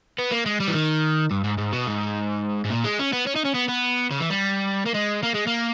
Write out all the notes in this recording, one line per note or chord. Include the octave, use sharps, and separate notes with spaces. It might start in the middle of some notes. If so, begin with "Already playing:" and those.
B3
A#3
G#3
G3
E3
D#3
G2
G#2
G#2
B2
G#2
G#2
A#2
G#3
C#4
B3
C#4
D#4
C#4
B3
B3
C#3
E3
G3
A#3
G#3
A#3
G#3
A#3